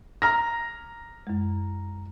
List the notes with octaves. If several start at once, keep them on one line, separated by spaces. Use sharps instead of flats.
A#5 F6 A#6
F#2 G#3